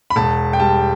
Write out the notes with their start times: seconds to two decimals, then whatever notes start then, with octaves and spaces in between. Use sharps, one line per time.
0.10 B5
0.16 E1 A5
0.53 G5
0.60 G3 A5